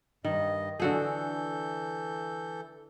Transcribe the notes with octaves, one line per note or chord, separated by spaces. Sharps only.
G2 D#3 D#5
D3 E3 F#4 G#4 A4 G6